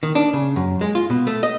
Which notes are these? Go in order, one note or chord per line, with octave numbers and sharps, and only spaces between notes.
D#3
D4
C#3
F#2
G#3
F4
B2
A3
D#5